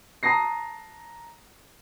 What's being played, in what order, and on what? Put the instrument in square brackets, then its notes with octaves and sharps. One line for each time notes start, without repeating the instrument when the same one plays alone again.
[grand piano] A5 A#5 D#6 A#6 C7